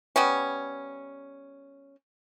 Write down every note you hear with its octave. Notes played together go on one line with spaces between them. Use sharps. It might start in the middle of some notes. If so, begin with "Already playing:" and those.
G3 B3 C#4